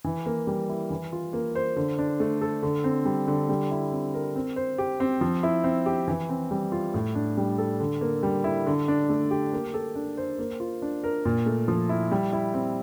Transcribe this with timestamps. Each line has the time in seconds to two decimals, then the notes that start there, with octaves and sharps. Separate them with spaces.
0.04 E3
0.26 A#3
0.47 G3
0.69 E4
0.90 E3
1.12 F4
1.33 A#3
1.55 C5
1.76 D3
1.99 D4
2.20 A3
2.41 A4
2.63 D3
2.84 C4
3.05 G3
3.28 D3
3.49 G3
3.71 E4
3.92 C4
4.14 A#4
4.35 C4
4.56 C5
4.78 G4
5.00 C4
5.21 F3
5.43 E4
5.64 C4
5.86 G4
6.08 E3
6.29 C4
6.51 G3
6.72 F4
6.94 A2
7.15 D4
7.37 G3
7.58 A4
7.80 D3
8.01 A#3
8.23 G3
8.44 E4
8.66 D3
8.88 D4
9.10 A3
9.31 G4
9.53 A#3
9.74 A4
9.95 D4
10.17 C5
10.38 A#3
10.60 F4
10.82 D4
11.04 A#4
11.25 A#2
11.46 A3
11.68 F3
11.89 E4
12.11 G3
12.33 E4
12.54 C4